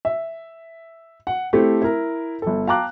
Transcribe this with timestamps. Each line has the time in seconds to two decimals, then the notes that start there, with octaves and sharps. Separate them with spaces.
0.05 E5
1.27 F#5
1.53 A3 C4 E4 G4 A4
1.82 E4 A#4
2.42 G1 A4
2.67 F5 G5 A5 A#5 D6 F#6